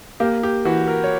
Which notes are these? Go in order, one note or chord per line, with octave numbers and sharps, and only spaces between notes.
A#3 G4
G4
E3 F#4
A#4
C#5